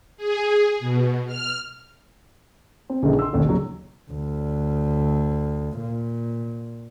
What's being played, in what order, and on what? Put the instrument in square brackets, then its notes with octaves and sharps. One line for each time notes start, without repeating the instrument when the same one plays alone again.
[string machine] G#4
B2
F6
[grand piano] C4
A#1 C#3 E3 D#4 A4
C6 E6
E1 A1 D#2 D3
A#2 C#3 F#3
[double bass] D2
A#2